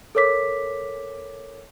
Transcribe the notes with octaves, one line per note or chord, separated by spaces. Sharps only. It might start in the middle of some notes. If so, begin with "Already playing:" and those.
A4 A#4 C#5 D6 B6